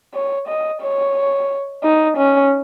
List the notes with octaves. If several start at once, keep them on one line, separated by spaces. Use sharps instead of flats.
C#5
D#5
C#5
D#4
C#4